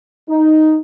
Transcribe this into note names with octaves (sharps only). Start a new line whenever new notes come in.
D#4